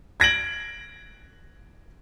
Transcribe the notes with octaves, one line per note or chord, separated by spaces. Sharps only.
G#6 A#6 D7 F#7